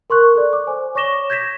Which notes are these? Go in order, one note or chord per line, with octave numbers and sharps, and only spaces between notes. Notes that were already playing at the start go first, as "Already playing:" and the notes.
A#4 C6 C#6 F#6
A4 D5
D6
C5 G#5
C#5 C#6 D6 A#6 E7 G7
G6 G#6 A#6 B6 E7